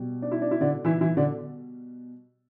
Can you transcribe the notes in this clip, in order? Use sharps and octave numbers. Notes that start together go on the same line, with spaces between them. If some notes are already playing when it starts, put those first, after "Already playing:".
Already playing: B2 G3
D4
E4
D4
E4
D3 D4
E3 E4
E3 E4
D3 D4